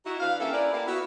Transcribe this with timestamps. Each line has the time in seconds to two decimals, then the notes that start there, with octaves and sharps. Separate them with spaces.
0.05 D#4 E4 F#4
0.20 E3 D4 B4 F5
0.40 A#3 C#4 G4 A4 E5
0.52 C#4 E4 A#4 B4 D5
0.72 A#3 E4 G4 A4 D5 F5
0.86 B3 E4 F#4